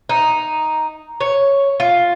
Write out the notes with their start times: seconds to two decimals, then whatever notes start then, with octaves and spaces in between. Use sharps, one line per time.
0.09 D#4
1.21 C#5
1.80 F4